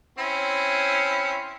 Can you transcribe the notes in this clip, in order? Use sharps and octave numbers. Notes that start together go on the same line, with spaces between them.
C4 C#4 E4